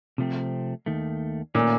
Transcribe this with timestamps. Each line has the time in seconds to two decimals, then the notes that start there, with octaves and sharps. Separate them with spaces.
0.18 C3 F3 A3 C4
0.86 D#2 D#3 A3
1.55 A#2 D#3 A3 C#4